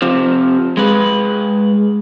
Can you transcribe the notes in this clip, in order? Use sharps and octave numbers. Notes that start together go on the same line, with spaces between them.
C3 F3
G#3 B4